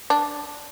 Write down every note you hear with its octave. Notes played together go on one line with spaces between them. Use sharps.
D4